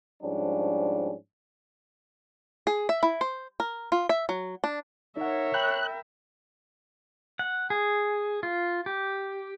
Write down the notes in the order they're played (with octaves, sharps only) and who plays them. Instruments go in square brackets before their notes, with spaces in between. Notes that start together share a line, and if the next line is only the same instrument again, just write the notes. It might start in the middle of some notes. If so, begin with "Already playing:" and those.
[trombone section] G#2 F3 G3 C#4 D4
[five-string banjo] G#4
E5
E4
C5
A#4
F4
E5
F#3
D4
[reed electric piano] D#4 F#5 [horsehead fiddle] A#4 E5 [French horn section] C#5
[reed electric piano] G5 B5 G6 [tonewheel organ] F#6
[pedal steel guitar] F#5
G#4
F4
G4